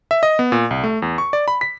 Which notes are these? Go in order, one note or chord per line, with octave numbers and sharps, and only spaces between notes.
E5
D#5
B3
A#2
C2
A3
E2
C#6
D5
B5
B6